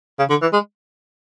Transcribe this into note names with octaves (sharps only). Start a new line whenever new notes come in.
C#3
D3
E3
G#3